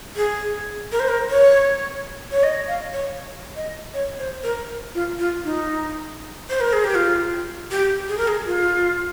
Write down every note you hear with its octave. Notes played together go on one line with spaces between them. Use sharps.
G#4
A#4
C5
A#4
C#5
C#5
D#5
F5
C#5
D#5
C#5
C5
A#4
F4
F4
D#4
C5
A#4
G#4
G4
F4
G4
G#4
A#4
G#4
F4